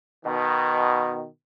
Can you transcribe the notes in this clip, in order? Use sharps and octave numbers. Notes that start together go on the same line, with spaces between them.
B2 D#3